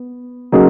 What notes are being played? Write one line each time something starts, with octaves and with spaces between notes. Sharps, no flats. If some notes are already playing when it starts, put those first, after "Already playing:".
Already playing: B3
C#3 F#3 A#3 D#4 G#4